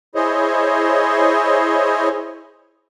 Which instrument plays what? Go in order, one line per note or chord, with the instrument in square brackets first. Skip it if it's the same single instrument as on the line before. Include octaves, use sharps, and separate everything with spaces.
[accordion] E4 G#4 C5 C#5 D#5